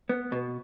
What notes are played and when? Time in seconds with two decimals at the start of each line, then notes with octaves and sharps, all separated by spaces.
0.09 B3
0.32 B2